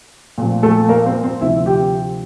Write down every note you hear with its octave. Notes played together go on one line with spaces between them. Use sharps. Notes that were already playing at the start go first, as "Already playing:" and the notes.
A#2 F3 A3 C4
A3 A4
A#3 A#4
C4 C5
C4 C5
D2 C3 F3 C4 E4 E5
G4 G5